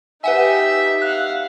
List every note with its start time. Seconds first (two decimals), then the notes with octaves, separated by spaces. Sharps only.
0.24 D#4 G4 B4 E5 F#5 G#5
1.02 F5 F#5 F#6